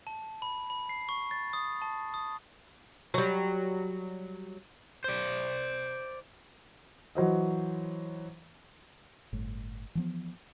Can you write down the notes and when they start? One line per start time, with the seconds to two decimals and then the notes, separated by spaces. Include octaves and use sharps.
0.07 A5
0.42 B5
0.70 B5
0.89 C7
1.09 C#6
1.31 A6
1.53 D#6
1.82 A5
2.14 D#6
3.14 F#3 G3
5.04 C5 D5
7.15 E3 F#3 C5 D#5
9.33 G1 A2
9.95 E3 F3 B3